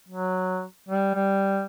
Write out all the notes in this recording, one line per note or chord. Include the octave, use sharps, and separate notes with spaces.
F#3
G3
G3